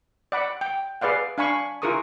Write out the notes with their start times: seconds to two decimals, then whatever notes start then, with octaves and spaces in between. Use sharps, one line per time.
0.32 D5 F#5 B5
0.61 G5
1.01 G#4 B4 D5 F5 F#5
1.38 D4 F5 G#5 B5 C#6
1.82 E4 F4 G#4 A#4 C#6 D#6